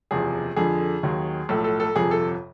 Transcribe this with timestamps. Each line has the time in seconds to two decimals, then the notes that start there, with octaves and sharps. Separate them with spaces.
0.11 F#1 E2 C3 F3 G#4
0.56 F2 D3 F3 G#4
1.03 D#2 D#3 F#3
1.49 B1 A2 F3 A4
1.64 A4
1.80 A4
1.95 G1 F2 C3 F3 G#4
2.11 A4